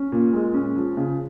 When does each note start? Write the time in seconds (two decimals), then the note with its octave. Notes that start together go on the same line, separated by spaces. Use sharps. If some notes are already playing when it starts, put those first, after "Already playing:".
Already playing: C#4
0.12 A#2
0.33 G#3
0.54 C#4
0.76 F3
0.97 C#3